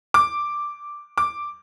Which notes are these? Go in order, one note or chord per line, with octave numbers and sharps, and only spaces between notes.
D6
D6